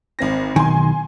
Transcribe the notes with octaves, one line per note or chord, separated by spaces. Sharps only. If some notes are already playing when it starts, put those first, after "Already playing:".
G#1 C4 A#6
B1 D#3 G#5 C6